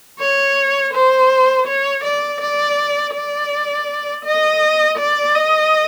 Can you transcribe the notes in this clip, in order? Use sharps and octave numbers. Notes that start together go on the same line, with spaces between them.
C#5
C5
C#5
D5
D5
D5
D#5
D5
D#5